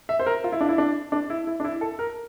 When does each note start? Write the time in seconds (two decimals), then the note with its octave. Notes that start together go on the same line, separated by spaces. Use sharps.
0.09 E5
0.20 C5
0.26 A#4
0.44 F4
0.52 E4
0.61 D4
0.69 E4
0.78 D4
1.12 D4
1.30 E4
1.47 E4
1.60 D4
1.64 E4
1.81 A4
1.99 A#4